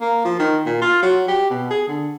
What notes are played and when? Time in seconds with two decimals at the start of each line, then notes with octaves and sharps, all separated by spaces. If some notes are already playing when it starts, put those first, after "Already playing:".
0.01 A#3
0.25 F3
0.39 D#3
0.66 A#2
0.82 F4
1.03 F#3
1.28 G4
1.50 B2
1.71 G#4
1.88 D3